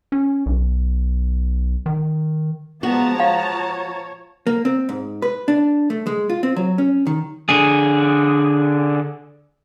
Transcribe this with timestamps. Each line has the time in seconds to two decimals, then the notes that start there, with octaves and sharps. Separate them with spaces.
0.12 C#4
0.46 B1
1.86 D#3
2.83 F3 G#3 B3 F#4 A5 A#5
3.20 C#5 F5
4.47 A#3
4.65 C4
4.89 G#2
5.22 B4
5.48 D4
5.90 A3
6.07 G#3
6.30 F4
6.43 C4
6.56 F#3
6.78 C#4
7.07 D#3
7.49 D3 G#4